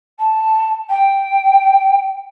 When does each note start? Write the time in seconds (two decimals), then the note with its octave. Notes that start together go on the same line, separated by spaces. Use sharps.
0.19 A5
0.89 G5